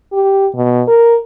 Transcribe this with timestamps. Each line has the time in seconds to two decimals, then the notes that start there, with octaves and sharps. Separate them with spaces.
0.13 G4
0.55 B2
0.88 A#4